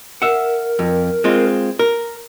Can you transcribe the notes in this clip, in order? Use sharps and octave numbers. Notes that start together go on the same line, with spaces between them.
A#4 E5 F#5
F2
G#3 C4 F4
A#4